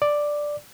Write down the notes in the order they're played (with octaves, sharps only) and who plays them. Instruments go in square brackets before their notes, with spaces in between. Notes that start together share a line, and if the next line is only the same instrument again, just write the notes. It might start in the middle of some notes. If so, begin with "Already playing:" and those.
[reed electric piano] D5